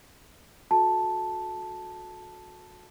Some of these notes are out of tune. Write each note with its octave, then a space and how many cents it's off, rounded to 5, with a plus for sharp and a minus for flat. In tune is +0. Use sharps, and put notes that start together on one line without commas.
F#4 -30 A4 -25 A5 +0